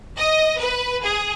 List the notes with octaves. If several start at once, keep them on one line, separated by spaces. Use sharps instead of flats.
D#5
B4
G#4